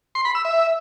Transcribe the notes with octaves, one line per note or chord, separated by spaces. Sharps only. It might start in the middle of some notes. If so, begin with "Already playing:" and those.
C6
B5
E6
E5